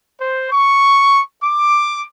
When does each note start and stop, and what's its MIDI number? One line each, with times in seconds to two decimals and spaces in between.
0.20 0.47 72
0.51 1.20 85
1.42 2.04 86